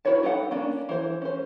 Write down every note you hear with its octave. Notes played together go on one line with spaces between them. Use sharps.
E4 F#4 B4 C#5 A5
D#4 G4 A4 F#5
A#3 C#4 D4 A#4
E3 C5
C#4 C5